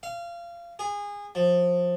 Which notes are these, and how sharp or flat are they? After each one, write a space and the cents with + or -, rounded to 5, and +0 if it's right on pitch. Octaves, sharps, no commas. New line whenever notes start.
F5 -25
G#4 -25
F3 +20